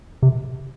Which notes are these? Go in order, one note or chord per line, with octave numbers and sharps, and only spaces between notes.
C3